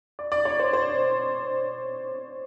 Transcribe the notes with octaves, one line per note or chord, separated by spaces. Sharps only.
D5
D5
C#5
C5
C5